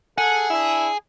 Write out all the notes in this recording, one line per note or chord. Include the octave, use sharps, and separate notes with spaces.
G#4 A4 F#5
D4 E4